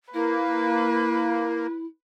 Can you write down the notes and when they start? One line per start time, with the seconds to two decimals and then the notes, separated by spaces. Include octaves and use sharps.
0.14 A#3 E4 B4